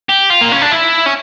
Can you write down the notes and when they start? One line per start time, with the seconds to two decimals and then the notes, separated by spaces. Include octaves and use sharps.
0.09 G4
0.30 F4
0.41 A#3
0.52 C#4
0.62 D4
0.72 E4
1.06 C#4